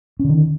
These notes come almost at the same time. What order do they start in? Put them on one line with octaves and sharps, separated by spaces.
C#4 D3 D#3